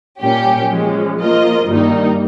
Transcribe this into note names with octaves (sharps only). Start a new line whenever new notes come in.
A#2 G3 A#3 C#4 G4
F3 G#3 C#4
F3 A#3 F4 A#4 D#5
G2 D#3 G3 A#3 D#4